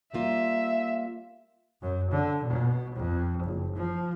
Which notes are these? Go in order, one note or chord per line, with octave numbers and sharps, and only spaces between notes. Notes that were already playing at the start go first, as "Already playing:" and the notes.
G3 A#3 F4 E5
F#2
D3
B2
F2
F#1
F3